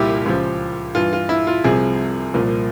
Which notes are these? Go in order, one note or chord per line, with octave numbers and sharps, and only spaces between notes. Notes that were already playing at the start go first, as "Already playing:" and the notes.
Already playing: C2 A#2 F3 E4 F4 G4
C#2 C#3 F3
G2 E3 F4
F4
E4
F4
C2 C3 F3 G#4
C2 A#2 F3